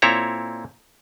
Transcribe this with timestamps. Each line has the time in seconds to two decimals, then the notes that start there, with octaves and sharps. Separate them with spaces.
0.02 A#2 C4 E4 A4 C#5 A#5